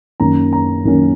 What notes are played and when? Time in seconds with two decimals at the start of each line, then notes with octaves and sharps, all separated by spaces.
0.20 F#2 D#3 A#3 C#4 A#5
0.53 A#5
0.85 F#2 D#3 A#3 C#4